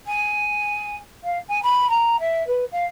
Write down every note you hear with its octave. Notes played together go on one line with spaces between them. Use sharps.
G#5
F5
G#5
B5
A#5
E5
B4
F5